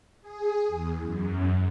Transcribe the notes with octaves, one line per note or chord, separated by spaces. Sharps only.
G#4
E2
F#2